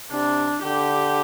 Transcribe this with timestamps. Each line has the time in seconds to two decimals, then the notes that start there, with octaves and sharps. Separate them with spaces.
0.11 C3 D4
0.63 D3 G4